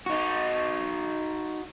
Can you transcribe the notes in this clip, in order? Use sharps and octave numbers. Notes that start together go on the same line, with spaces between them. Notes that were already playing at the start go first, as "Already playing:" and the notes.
D#4 F#4